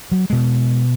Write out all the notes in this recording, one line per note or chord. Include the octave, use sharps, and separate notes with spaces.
F#3
B2 G#3